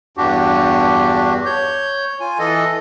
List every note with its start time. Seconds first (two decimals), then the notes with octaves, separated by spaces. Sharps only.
0.17 E2 G2 D4 F#4 G4
1.45 C#5 G6
2.20 F4 G#5
2.39 E3 A4 D#5